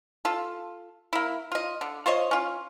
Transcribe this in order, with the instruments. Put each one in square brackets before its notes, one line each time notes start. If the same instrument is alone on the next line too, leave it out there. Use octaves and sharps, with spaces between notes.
[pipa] F4 A4
A#3 E4
F4 D#5
D3
F4 C5 C#5 D#5
C#4 F4